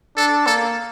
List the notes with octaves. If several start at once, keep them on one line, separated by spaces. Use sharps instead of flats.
D4 A4
A#3 A4